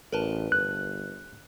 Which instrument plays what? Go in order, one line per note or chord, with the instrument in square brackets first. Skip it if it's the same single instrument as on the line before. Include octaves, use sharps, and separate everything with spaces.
[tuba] A1 [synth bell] A#4 B4 A5
[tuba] G1 [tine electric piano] F#6